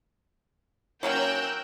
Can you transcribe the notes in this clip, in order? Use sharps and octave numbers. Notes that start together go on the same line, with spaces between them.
F#3 A#3 C#4 A#4 G5 E6 F#6 G6